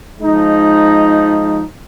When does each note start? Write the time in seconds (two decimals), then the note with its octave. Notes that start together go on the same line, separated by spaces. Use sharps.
0.19 F3 G#3 D#4